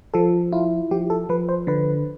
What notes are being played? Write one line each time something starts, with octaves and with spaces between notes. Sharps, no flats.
F3 A4
E4 F4
F3 G4
A4
F3 B4
C5
D3 B4